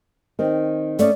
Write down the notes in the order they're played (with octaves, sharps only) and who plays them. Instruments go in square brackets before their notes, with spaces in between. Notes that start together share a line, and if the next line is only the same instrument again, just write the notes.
[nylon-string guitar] D#3 C4
[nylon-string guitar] A3 C#4 D#5 [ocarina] D5